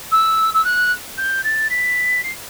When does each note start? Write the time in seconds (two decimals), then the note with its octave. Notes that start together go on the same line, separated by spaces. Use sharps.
0.12 E6
0.54 E6
0.64 F#6
1.17 G6
1.44 A6
1.70 B6
2.23 C7